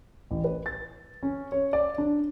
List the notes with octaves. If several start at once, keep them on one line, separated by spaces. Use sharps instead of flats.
A1
B4
A6
C#4
C#5
D5
D4